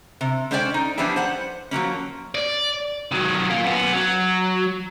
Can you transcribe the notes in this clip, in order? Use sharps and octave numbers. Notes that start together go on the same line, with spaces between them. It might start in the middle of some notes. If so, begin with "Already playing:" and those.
C3
G#3 C#4 C5 D5 F#5 G5
D#4
F3 G3 B3 C#4 D4 E4
C5 F#5
F3 F#3 A#3 C#4
D5
D#3 F#3
A#3 F4
F#2 B3
F#3